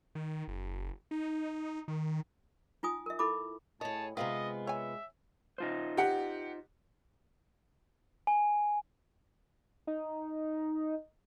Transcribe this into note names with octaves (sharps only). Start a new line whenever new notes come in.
D#3
F#1
D#4
D#3
D#4 F4 G#5 D#6
A#4 E5
E4 A4 B5 D6
A2 G#4 C#5 D#5 A5
C3 G#3 B3 C4 F4 D#5
C#5 E5 G#5
D#4 F4 C5
G4 F#5
G#5
D#4